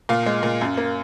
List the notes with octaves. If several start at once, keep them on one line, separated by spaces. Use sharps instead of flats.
A#2 F5
G#3
A#2
F#2
A#3